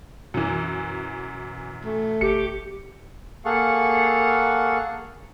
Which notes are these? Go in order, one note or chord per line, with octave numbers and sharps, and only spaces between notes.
F#2 B2 E3
A3
G1 G4 C#7
A#3 G#4 A4 F5 F#5 C#6